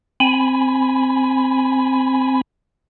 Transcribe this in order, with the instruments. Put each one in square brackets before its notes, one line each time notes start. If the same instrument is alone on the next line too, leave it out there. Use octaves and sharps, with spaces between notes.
[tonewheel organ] C4 G#5 B5